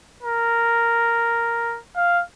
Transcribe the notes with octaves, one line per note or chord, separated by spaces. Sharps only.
A#4
F5